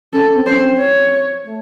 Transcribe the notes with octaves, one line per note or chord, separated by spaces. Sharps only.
C#4 A4
C4
C#4 C5
C4
C#5
A3